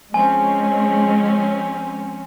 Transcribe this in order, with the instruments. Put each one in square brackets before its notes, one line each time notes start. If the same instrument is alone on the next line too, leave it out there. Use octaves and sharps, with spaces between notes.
[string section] F3 C4 C#4 [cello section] G#3 [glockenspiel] G#5